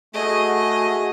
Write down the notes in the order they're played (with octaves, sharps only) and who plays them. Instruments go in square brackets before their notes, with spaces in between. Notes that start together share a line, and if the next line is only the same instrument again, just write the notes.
[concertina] A3 [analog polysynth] F#4 G#4 [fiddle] D#5